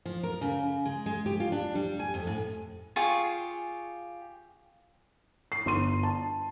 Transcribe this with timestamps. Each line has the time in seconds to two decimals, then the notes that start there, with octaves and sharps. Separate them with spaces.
0.05 F3
0.23 A#4
0.41 C#3
0.85 G#3
1.06 G#3
1.26 G4
1.40 F4
1.52 D4
1.75 G3
1.99 G#5
2.14 F2
2.27 A2
2.96 F4 G4 G#4 C#6
5.52 C7
5.66 G1 C6 D#7
6.03 A5